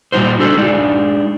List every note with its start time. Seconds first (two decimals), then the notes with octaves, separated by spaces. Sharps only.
0.12 A#2 G3 D#4 F#4 C5
0.39 D4 F#4 A4 C5
0.57 G#3 D4 D#4